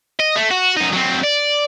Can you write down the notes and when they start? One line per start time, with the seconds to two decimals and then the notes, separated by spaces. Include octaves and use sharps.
0.20 D#5
0.36 A3
0.51 F#4
0.77 F#2 D#4
0.93 F#3 C4
1.24 D5